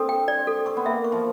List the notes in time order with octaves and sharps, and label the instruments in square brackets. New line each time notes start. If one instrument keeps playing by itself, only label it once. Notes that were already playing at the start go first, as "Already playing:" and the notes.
Already playing: [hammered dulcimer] C4 D4 [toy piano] A4
[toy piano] G5
D5
A4
[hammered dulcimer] C4 [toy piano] C#6
[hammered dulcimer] B3
[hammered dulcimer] A#3 [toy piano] E5
[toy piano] C#6
[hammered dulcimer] F3